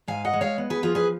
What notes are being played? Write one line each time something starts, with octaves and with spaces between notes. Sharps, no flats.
G#2 F5 G#5
D#5 F#5
G#3
C#5 F5
B3
G#4 B4
F3 F4 G#4
G#4 B4